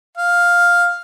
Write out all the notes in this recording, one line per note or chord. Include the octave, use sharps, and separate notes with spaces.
F5